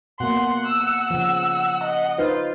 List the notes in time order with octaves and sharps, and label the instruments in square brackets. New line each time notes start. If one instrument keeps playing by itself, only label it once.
[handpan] B2 A#3 [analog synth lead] F#5 [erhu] C6
[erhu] E6
[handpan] C#3 F3 [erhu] E6
[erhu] D#5
[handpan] D#4 B4 C5 [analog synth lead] F4